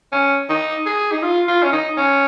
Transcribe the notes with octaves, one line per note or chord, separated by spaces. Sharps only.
C#4
D#4
G#4
D#4
F4
F4
C#4
D#4
C#4